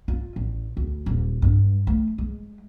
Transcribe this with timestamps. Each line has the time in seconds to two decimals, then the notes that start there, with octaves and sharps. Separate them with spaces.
0.08 F4
0.36 A1
0.77 D2
1.06 D#1
1.42 G2
1.87 A3
2.18 G#3